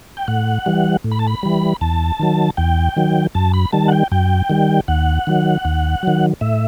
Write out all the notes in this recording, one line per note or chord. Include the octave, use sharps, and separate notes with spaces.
G5
A2 F#5
E3 G3
A2
B5
A5
B5
E3 G3
E2 A5
D#3 F#3
E2 G5
D#3 F#3
F#2 A5
B5
D#3 G3 A5
F#5
G5
F#2 G5
D#3 G3
D#2 F#5
D#3 F#3
D#2
D#3 F#3
A2 E5